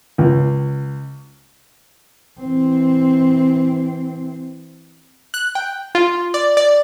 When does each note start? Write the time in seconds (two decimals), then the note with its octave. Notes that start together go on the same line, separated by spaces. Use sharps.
0.18 C#2
2.39 E3 C4
5.34 F#6
5.55 G5
5.95 F4
6.34 D5
6.57 D5